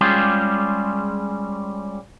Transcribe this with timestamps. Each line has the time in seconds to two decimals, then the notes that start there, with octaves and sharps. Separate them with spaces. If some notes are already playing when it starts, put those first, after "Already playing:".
0.01 G3 G#3 C#4 F4 G4 G#4